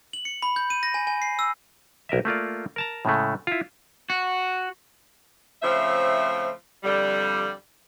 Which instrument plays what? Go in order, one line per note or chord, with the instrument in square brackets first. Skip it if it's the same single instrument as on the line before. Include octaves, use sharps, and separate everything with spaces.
[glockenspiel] F#7
C#7
B5
G6
D#7
A#6
G#5
G#5
C7
E6
[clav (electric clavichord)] B1 A#4 D#5 E5
A3 A#3 F4 D5
A#4 A5 A#5
A2 C#3 G#3 A3
E4 F4
[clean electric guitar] F#4
[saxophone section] C#3 F3 A3 C4 E5
F2 D3 G3